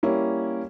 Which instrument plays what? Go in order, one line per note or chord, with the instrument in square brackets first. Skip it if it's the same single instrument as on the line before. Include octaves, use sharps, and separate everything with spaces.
[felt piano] G3 A#3 C#4 E4